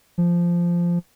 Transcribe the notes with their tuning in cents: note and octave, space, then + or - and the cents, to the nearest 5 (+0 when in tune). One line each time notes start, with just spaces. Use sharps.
F3 -10